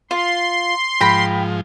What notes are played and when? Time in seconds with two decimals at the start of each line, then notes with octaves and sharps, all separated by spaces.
0.11 F4 C6
1.01 G#2 F3 G5 A#5 B5